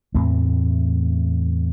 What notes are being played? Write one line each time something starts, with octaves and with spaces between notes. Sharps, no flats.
E2 A2 A3 C4